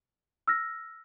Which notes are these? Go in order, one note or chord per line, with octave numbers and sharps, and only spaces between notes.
E6 F6 A#6